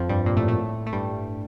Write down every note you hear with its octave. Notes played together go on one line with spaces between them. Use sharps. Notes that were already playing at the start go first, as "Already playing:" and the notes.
Already playing: F2 F3
G2 G3
A#2 A#3
A2 A3
A2 A3
A3
G2 G3